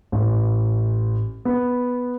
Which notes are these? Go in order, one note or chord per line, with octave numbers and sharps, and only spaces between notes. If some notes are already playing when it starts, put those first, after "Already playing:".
A1
B3